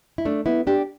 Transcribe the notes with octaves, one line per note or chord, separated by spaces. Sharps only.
E4
A3 D4
B3 E4
D4 G4